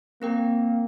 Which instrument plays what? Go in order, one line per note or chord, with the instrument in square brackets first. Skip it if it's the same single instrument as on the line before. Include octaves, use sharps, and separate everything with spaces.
[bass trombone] A#3 [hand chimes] C4 A#4 G5